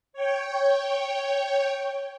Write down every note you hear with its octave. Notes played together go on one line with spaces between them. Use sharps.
C#5 G5